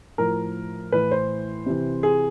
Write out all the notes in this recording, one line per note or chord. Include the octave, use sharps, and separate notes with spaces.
A2 F3 A#4
A2 E3 B4
C5
C3 E3
G#4